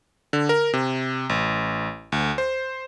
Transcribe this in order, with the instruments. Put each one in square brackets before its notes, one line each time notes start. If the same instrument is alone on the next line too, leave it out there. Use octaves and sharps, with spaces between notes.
[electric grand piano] D3
A#4
C3
A1
D2
C5